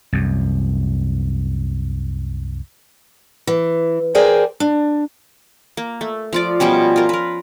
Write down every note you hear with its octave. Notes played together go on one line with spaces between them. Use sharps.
C2 F#2
E3
G#4 A#4 C5 D5 G5 G#5
D4
A#3
A3
F3 F4 D5
B2 F3 G3 C#4
F4 A#4
A#4 B4